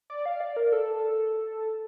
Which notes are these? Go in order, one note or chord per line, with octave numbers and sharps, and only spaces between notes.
D5
F5
D5
A#4
A4